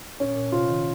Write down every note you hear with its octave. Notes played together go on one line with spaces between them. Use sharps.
A#2 C#4
A#2
C3 F4
D#3